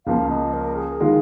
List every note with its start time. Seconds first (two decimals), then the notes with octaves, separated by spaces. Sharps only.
0.06 C#2 C#3 F3 A#3 F5
0.30 D#5
0.54 A#4
0.76 G#4
1.00 D#3 G#3 F4